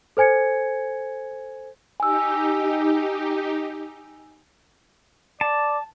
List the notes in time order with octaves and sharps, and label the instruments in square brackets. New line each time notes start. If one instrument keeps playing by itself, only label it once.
[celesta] A4 C5 G#5 G#6 C#7
[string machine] D#4 G4 [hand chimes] G#5 E6
[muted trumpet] D5 [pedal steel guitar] A5